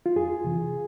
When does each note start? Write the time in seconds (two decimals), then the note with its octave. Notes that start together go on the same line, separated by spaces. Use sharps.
0.06 F4
0.16 F2 G#4
0.44 C3 E3